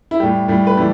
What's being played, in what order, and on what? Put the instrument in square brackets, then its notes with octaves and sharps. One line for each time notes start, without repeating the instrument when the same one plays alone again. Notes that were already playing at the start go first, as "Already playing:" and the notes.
[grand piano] E4
A2 G3 G4
A2 G3
B4
A2 E3 G3 A4